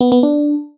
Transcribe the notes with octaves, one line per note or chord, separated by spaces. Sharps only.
B3
B3
D4